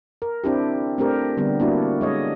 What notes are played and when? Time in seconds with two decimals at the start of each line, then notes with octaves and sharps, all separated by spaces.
0.22 A#4
0.44 C4 D4 E4 G4
0.98 A3 C4 D4 G4 A#4
1.37 D3 G3 B3
1.60 A#3 D4 E4 F#4
2.01 G#3 C#5 D#5